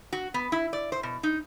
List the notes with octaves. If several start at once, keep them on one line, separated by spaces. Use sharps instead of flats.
F#4
B3
E4
D5
C5
B2
D#4